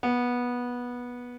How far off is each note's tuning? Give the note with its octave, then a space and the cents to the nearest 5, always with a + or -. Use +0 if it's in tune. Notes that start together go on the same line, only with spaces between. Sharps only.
B3 -15